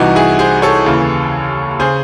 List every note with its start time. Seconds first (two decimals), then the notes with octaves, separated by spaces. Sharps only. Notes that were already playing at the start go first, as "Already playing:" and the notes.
Already playing: C2 C3 E3 D#4 F#4
0.15 E4 G#4
0.39 G#4 C5
0.62 A4 C#5
0.86 D#2 C#3 E3
1.80 C#3 G#4 C5